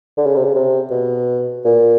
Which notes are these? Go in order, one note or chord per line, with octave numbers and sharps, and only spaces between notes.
D3
C#3
C3
C#3
C3
B2
A#2